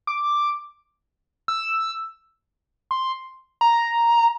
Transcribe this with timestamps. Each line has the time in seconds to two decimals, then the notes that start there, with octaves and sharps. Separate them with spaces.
0.07 D6
1.48 E6
2.91 C6
3.61 A#5